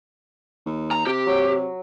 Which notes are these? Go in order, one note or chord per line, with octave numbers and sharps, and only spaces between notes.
D#2
A#5
C3 G4
F#3